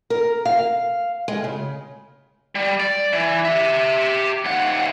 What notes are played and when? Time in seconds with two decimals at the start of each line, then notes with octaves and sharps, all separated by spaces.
0.10 A#4
0.45 F5
1.28 G#3
1.44 C#3
2.55 G3
2.80 D5
3.13 E3
3.45 G4 E5
4.45 D#2 F#5